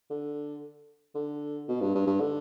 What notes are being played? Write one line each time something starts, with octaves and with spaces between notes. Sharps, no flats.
D3
D3
B2
G2
G2
G2
D3